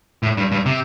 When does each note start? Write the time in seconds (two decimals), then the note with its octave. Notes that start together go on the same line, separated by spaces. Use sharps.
0.23 A2
0.37 G2
0.52 G2
0.66 C3